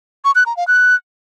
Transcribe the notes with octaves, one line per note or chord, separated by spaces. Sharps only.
C#6
F#6
A#5
F5
F#6